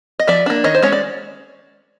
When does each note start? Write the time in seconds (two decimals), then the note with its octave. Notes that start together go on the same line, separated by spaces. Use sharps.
0.19 D#5
0.27 F3 D5 E5
0.46 A#3 D4
0.64 D#3 C#5 D#5
0.75 C5
0.82 G#3 C#4 C#5
0.92 D5